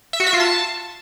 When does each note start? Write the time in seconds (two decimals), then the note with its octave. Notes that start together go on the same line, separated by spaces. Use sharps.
0.13 E5
0.20 F#4
0.27 E5
0.33 F4
0.40 A5